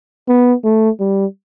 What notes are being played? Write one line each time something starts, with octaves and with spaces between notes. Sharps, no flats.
B3
A3
G3